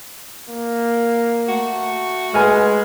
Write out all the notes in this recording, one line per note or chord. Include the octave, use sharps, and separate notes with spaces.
A#3
A3 F#4
G#3 B4 G#5 F6